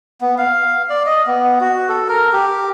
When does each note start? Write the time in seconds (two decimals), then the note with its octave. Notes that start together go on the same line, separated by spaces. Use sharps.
0.21 B3
0.38 F5
0.90 D5
1.06 D#5
1.26 B3
1.61 F#4
1.89 A4
2.08 A#4
2.33 G4